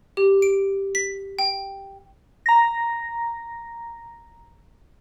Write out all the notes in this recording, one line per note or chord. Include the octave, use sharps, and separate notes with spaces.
G4
D7
B6
G5
A#5 A#6